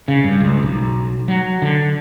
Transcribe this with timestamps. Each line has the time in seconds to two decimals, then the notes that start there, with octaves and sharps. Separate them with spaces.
0.08 C#3
0.24 G2
0.40 C#2
0.63 B1
1.28 F#3
1.62 D3